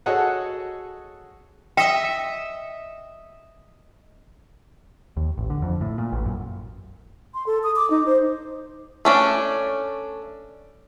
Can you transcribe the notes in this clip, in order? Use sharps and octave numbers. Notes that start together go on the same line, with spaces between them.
F#4 G#4 A4 C#5 D#5 F#5
D#5 E5 G5
D#2
A1
D3
F2
A2
A#2
A1
F#2
C6
A4
D#6
D6
D#4
C5
A3 C#4 D4